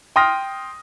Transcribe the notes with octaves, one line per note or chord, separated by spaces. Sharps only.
G5 C6 D#6 F6 A#6